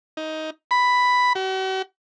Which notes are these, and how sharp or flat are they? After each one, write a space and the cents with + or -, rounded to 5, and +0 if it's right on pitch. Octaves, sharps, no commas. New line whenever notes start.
D#4 +15
B5 +5
F#4 +45